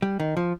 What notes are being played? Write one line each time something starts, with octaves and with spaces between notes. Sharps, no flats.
G3
D#3
F3